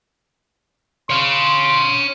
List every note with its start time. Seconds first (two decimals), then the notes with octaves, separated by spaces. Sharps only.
1.10 C#5 F5 C6